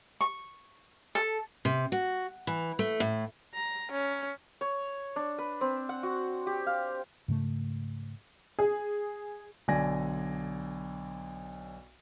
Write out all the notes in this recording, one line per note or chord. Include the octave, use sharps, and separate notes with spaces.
C#6
A4
C3
F#4
E3
A3
A2
A#5
C#4
C#5
D4
B4
C4
F#5
F#4
G4
F5
G#2 C#3 A3
G#4
B1 D3 D5 G#5 G#6 A#6